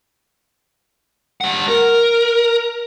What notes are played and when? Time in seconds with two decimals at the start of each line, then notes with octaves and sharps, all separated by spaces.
1.41 G3 F#5
1.68 A#4